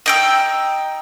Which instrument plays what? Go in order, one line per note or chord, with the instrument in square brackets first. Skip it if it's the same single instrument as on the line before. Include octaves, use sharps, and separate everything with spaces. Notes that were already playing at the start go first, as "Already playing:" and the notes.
[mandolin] D#4 G5 E6